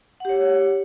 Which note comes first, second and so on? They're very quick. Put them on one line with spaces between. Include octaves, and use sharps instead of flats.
F#5 G4 C#5